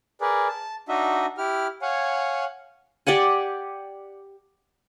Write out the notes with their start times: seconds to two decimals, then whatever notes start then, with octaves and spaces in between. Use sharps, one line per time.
0.21 G#4 A#4 B4 D5
0.48 A5
0.89 D4 D#4 F#4 D#5 E5
1.38 E4 G4 F6
1.82 C#5 F5 F#5 G#5
3.07 G4 D5 F#5 G#5